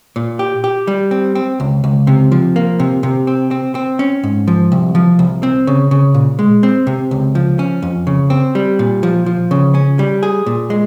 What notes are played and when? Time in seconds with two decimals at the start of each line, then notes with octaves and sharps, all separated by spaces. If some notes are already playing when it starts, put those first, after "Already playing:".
0.16 A#2
0.39 G4
0.64 G4
0.87 G3
1.11 C4
1.35 C4
1.60 C#2
1.84 C#2
2.07 C3
2.32 F3
2.56 A#3
2.80 C3
3.03 C3
3.27 C4
3.51 C4
3.75 C4
3.99 C#4
4.23 G#2
4.48 F3
4.72 C2
4.95 F3
5.19 C2
5.43 C4
5.67 C#3
5.91 C#3
6.14 A#2
6.39 G#3
6.63 C4
6.87 C3
7.11 C#2
7.35 F3
7.59 C#4
7.82 F2
8.07 C#3
8.30 C4
8.55 G3
8.79 A#2
9.03 F3
9.26 F3
9.51 C#3
9.75 C#4
9.99 G3
10.23 G#4
10.46 A#2
10.70 G#3